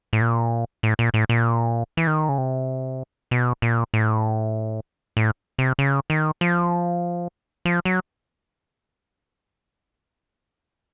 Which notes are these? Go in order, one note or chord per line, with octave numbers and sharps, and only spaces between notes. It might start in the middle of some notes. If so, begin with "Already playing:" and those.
A2
A#2
A2
A#2
A2
A#2
E3
D#3
C#3
C3
B2
A#2
A2
A2
C3
C#3
D#3
F3
F3
F#3